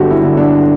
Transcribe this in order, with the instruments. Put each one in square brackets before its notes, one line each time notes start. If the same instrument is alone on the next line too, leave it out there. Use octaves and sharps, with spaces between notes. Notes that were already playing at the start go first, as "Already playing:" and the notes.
Already playing: [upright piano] G1 G2 F#3 F#4 G4 A4
E4
D3
D4